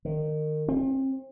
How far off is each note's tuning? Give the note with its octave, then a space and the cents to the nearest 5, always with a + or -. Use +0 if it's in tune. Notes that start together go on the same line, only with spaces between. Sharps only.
D#3 -25
C4 +35